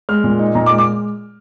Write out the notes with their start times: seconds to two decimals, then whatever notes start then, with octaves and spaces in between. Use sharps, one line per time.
0.09 G#3 F6
0.24 A#2
0.39 D#4
0.55 A#2 A#5
0.66 D6
0.71 G#3
0.78 D6